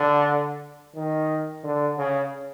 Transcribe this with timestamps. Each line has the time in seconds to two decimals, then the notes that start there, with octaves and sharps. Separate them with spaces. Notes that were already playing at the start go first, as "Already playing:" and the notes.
Already playing: D3
0.95 D#3
1.64 D3
1.98 C#3